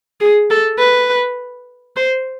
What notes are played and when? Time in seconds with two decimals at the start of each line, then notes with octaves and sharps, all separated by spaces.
0.20 G#4
0.50 A4
0.79 B4
1.96 C5